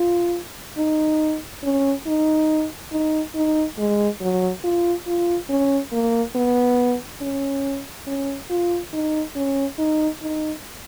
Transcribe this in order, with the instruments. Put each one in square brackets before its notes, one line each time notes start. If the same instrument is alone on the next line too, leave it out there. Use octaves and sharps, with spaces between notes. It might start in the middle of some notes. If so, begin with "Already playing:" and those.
Already playing: [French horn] F4
D#4
C#4
D#4
D#4
D#4
G#3
F#3
F4
F4
C#4
A#3
B3
C#4
C#4
F4
D#4
C#4
D#4
D#4